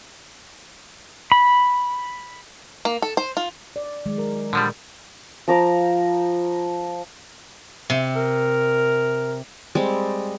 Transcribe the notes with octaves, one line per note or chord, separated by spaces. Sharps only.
B5
A#3
A4
C5
F4
D5
D#3 F#3 G#3
A#4
A#2 D3 F3 G3
F3 A#5 D6
C3
A#4
G3 G#3 C4